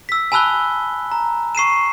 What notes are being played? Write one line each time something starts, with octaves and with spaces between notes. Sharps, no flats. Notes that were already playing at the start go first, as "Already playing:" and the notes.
E6 B6
G#5 A5 B5 E6 F#6 G7
A#5
C#6 C7 D#7 E7